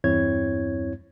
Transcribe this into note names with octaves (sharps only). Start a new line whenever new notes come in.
E2 G2 C4 E4 C#5 G#6